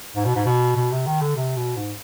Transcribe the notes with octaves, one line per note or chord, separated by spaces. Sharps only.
G#2
B2
G#2
B2
B2
C3
D#3
D3
C3
B2
G#2